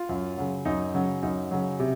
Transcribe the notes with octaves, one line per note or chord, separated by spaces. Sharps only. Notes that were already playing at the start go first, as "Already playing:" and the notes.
Already playing: F4
F#2
C#3 F#3
F#2 D#4
C#3 F#3
F#2 D#4
C#3 F#3
C3